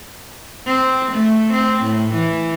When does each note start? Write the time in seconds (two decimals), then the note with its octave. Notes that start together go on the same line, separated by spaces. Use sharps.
0.66 C4
1.12 A3
1.52 C4
1.83 A2
2.13 E3